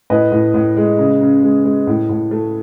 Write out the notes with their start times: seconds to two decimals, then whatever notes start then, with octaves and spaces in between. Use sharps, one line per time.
0.10 A2 B4 D#5
0.32 A2
0.54 A2
0.76 G#3
0.98 C#3
1.21 C#3
1.43 G#3
1.65 G#3
1.87 A2
2.09 A2
2.31 A3